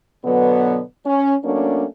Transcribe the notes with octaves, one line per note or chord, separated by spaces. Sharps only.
B2 D3 F#3 B3
C#4
F#3 A3 A#3 C#4 D4